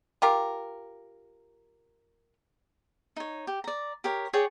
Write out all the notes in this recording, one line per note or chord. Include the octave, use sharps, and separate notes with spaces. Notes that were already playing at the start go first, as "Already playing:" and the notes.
F4 G4 A#4
D#4 C#5
G4
D5 A#5
G4 A#4 C#5
G#4 C#5 D5 G5